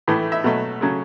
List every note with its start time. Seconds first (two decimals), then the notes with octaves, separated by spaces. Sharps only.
0.08 A2 E3 A3
0.32 E5
0.44 B2 F#3 A3
0.81 C#3 F#3 A3